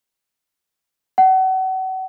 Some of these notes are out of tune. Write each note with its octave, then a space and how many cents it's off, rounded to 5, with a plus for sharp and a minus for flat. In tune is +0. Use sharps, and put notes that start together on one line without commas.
F#5 +35